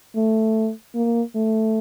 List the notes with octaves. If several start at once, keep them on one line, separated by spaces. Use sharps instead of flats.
A3
A#3
A3